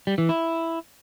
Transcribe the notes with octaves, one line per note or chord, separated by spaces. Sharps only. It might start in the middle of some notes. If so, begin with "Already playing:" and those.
G3
E3
E4